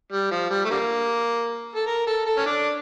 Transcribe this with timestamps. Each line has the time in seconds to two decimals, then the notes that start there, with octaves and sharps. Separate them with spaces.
0.12 G3
0.31 F3
0.50 G3
0.65 A3
0.70 D3 G3 A#3
1.75 A4
1.87 A#4
2.07 A4
2.26 A4
2.37 C#4
2.46 D4